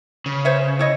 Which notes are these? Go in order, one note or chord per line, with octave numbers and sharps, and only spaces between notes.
C#3
C5 C#5 E5
E4 C#5 D#5